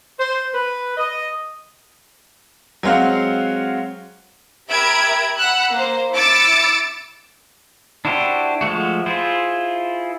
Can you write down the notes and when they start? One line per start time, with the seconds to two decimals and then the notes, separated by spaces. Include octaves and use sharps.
0.19 C5
0.54 B4
0.97 D#5
2.83 F#3 G#3 C4 F5 F#5
4.68 G4 A#4 E5 B5 G#6 D7
5.37 F#5 B5 E6 F#6
5.72 A#3 C5
6.13 E4 D6 E6 A6 C#7 D7
8.05 D4 E4 F#4 G4 C5
8.61 F3 G#3 A3 F#4
9.06 E4 F4 G#4 C5